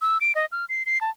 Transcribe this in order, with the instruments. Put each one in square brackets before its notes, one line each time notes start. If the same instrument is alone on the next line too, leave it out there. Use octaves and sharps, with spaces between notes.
[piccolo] E6
D7
D#5
F6
C7
C7
A5